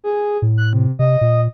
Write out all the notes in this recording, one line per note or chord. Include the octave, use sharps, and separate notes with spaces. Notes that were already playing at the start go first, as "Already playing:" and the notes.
G#4
A2
F#6
C3
C3 D#5
A#2